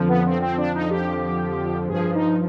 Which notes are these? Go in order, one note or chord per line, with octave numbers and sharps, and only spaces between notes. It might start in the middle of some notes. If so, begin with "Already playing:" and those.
Already playing: F2 D3 F3
B3
C4
C4
D4
D#4
G4
G2 F3 G#4
D#4